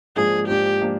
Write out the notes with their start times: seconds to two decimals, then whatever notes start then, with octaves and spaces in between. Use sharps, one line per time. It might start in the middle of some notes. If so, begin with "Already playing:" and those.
0.16 G#2 F3 A#3 D4 G#4
0.48 G#2 F3 A#3 D4 G4
0.81 F3 A#3 D4